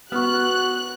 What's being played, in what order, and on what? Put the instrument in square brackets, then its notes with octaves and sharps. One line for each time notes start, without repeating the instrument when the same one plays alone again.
[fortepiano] B3 [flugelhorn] F#4 [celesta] C#6 F6 [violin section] F#6